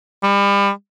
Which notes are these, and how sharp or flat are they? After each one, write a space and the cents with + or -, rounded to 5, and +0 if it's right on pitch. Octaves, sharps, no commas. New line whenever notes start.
G3 +35